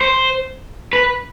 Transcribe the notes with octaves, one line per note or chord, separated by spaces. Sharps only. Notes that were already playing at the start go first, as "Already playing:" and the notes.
C5
B4